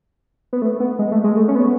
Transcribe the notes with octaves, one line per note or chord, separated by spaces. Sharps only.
B3
A3
B3
G#3
A3
G#3
A3
C#4
B3